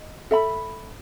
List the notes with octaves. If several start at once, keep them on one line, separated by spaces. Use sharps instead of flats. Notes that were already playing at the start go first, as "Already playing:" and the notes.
Already playing: D#5
A4 E5 B5